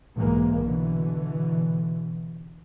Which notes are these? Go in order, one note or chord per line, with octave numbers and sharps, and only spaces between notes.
B1 G#2 E3 G#3 A#3
B2 D3 E3